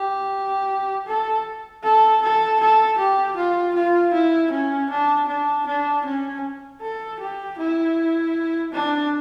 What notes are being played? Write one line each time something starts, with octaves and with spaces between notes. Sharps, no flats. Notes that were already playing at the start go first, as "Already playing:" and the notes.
Already playing: G4
A4
A4
A4
A4
G4
F4
F4
E4
C#4
D4
D4
D4
C#4
A4
G4
E4
D4